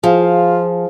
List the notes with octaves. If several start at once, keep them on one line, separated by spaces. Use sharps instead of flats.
F3 F4 G#4 F5